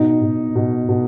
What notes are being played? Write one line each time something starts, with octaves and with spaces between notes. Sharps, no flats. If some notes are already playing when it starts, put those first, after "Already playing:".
Already playing: B2 D#4
B2
B2
B2